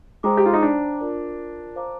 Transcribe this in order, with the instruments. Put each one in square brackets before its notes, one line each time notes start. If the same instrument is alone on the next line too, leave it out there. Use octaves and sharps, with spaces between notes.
[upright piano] G#3 [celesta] C5 G5 A#5 D6
[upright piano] G4
F4
D#4
D4
[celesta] F4 A#4 D5
C5 F5 A#5 D6